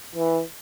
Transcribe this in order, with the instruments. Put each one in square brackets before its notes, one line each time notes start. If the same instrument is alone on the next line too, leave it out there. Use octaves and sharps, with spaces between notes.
[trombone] E3